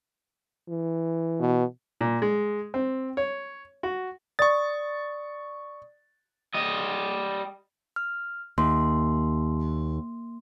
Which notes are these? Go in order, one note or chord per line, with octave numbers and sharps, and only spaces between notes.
E3
B2
A#2
G#3
C4
C#5
F#4
D5 C#6 D#6 A6
G3 D#5
F6
D#2 A#3 C6